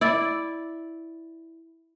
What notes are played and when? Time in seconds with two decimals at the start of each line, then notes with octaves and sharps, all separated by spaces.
0.01 E4 D5